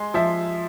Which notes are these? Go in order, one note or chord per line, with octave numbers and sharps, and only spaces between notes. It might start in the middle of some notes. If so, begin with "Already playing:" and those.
Already playing: G#3 C6
F3 E5